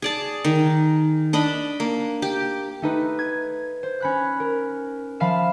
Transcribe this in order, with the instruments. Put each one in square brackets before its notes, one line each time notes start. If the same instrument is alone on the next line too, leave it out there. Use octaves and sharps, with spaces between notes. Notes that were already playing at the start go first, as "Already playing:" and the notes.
[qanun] G#4 D5 A5
D#3
D4 D#5 B5
A#3
G4
[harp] A3 D#4 B4
G#6
C5
C#4 B5 F#6
A#4
F3 E5 F5 B5 F6 E7